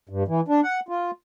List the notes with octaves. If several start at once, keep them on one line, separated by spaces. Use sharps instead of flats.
G2
E3
D4
F#5
F4